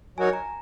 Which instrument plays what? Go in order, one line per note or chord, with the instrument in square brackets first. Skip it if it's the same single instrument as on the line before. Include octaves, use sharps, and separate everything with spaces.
[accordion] F#3 D#4 F#4 A#4 C#5 [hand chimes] G#5
[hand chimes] A#5